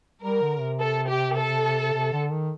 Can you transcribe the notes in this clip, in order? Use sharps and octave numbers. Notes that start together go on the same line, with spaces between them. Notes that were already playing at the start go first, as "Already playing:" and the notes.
G3 A#4
D3
C3
A4
G4
A4
C3
D3
D#3